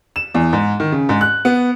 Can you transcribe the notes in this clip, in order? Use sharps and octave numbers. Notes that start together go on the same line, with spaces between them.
E7
E2
G#2
D#3
C#3
G#2
F#6
B3